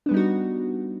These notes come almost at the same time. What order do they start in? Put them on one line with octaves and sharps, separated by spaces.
D4 B3 G3 D#4 F#4